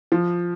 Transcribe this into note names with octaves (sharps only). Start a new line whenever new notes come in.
F3